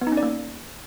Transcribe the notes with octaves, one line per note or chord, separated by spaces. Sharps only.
B3
D#4
C#4
D5
A#3